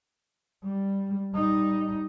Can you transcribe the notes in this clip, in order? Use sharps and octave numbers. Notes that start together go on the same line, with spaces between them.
G3
G3 D#4